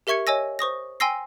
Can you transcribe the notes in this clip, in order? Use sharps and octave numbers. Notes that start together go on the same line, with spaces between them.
G4 A#4 E5 C#6 G#6 C#7
C#5 D#5 G#5 E6 A#6
C5 C#6 D#6 A#6
G5 G#5 C6 E6 A#6 C7